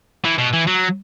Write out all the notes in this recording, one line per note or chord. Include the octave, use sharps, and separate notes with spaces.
E3
B2
E3
F#3